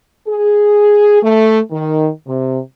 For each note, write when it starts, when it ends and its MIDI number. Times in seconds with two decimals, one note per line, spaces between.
0.28 1.19 68
1.23 1.59 57
1.71 2.09 51
2.27 2.59 48